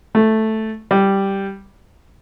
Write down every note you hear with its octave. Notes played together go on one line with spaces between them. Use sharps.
A3
G3